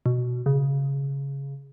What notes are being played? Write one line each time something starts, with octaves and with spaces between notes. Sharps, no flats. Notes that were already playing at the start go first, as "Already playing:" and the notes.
B2
C#3